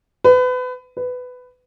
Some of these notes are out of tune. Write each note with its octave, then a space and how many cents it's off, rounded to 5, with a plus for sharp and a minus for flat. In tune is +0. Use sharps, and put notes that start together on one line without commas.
B4 +30
B4 +15